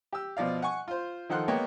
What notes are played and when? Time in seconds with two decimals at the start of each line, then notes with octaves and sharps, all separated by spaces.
0.13 G4 E6
0.37 B2 F3 D5 F5
0.62 F#5 G#5 C#6
0.88 F4 C5
1.29 D#3 F3 A4 F#5 C6 F#6
1.48 G#3 A#3 B3 C#5 G5